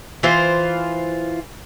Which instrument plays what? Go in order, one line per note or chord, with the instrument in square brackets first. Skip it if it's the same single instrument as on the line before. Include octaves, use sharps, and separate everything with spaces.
[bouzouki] E3 F4 C5